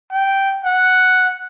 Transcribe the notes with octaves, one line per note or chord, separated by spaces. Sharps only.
G5
F#5